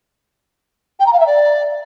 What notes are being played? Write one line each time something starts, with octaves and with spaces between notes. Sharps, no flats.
G5
A#5
F5
E5
D5